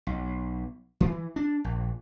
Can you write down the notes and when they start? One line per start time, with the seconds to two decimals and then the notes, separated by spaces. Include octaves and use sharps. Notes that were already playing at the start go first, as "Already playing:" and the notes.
0.07 B1
1.01 E3
1.36 D4
1.64 A#1